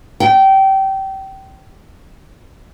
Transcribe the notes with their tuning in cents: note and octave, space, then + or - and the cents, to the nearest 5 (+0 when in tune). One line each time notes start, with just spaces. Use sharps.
G5 -25